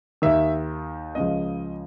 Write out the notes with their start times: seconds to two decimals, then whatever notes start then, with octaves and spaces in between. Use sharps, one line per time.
0.22 D#2 D#3 E5
1.15 C#2 C#3 F3 D#5